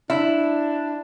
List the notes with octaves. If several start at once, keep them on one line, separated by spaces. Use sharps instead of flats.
D4 E4